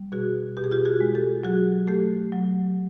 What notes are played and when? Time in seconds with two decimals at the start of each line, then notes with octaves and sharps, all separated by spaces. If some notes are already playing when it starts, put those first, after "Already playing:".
Already playing: G3
0.12 B2 F#4 G#4
0.57 B2 G4
0.64 G#4
0.71 F4 G4
0.85 F#4 G#4
1.01 G#3
1.15 G4 A4
1.43 F#3 F#4 G#4
1.87 A3 G4 A4
2.32 F#3